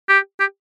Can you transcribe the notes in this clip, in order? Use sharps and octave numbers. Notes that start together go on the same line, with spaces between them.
G4
G4